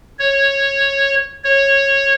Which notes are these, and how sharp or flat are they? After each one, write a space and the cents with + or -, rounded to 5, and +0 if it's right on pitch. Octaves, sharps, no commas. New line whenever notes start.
C#5 -10
C#5 -15